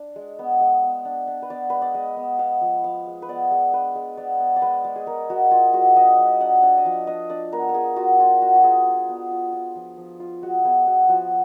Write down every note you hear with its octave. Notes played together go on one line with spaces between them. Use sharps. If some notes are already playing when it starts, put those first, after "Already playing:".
Already playing: D4
G#3
B3
G#3
B3
D4
D4
B4
B3 D5
G#3 B4
D5
G#3 D#5
B3
B3 F5
F3
F3 F5
G#3
B4
B3 D5
G#3
D4 B4
G#3
B3 D5
B3
D5
G#3 B4
G#3
G#4
G#3 A#4
G#3 F#4
G#3 F4
G#3 F#4
D4 D#5
G#3
D4 F#5
D4
D#5
F3 F5
D4 D#5
D4 D5
B3 A#4
A#4
F4 G#4
F4 F#4
D4 F4
F4 F#4
F#4
F4 G#4
F4
B3
F4
F4
F3
F3
F4
G#3 F#4
B3 G#4
B3 F#4
F3 F#4